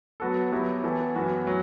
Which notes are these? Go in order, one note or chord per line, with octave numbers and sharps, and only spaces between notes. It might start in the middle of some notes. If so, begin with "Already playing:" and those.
F#3 B3 F#4 A4
F#3 B3 E4 G4
E3 B3 F#4 A4
F#2 E3 B3 F#4
F#3